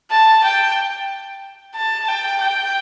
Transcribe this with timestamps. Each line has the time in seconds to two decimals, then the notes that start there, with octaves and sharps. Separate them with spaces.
0.11 A5
0.44 G5
1.76 A5
2.08 G5
2.41 G5